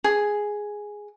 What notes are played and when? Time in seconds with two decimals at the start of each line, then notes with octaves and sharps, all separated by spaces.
0.04 G#4